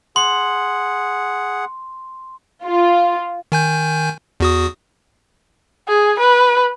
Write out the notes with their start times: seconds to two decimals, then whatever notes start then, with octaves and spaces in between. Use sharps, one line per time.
0.16 G#4 F#5 C6
2.66 F4
3.52 D#3 G#5 G6
4.40 E2 F#4 D#6
5.88 G#4
6.20 B4